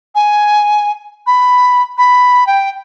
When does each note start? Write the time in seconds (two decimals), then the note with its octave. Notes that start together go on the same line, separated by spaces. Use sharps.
0.15 G#5
1.27 B5
1.98 B5
2.47 G5